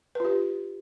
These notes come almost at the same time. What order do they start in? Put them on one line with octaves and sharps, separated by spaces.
B4 F4 G4